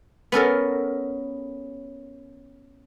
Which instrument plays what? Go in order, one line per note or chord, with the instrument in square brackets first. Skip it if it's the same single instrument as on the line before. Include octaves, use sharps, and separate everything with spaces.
[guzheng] B3 C#4 A4 A#4